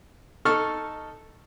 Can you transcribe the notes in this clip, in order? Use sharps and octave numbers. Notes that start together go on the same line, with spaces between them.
D#4 A4 A5 C#6 F6